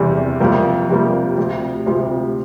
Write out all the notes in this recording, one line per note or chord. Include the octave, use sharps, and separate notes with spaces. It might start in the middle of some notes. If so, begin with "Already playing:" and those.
Already playing: E2 C3 G3
F2 C3 G3 A#3
F2 C3 G3 A#3
D2 C3 F3
D2 C3 F3